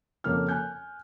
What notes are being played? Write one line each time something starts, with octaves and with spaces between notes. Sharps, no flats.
F2 C#3 A#3 A4 F6
G#5 F#6 G6